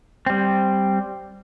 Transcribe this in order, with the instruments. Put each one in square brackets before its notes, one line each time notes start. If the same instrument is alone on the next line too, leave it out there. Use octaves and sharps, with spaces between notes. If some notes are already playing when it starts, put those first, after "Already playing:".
[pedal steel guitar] G3 C4